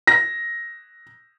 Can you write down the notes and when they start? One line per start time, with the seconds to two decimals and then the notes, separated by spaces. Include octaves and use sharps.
0.07 A#6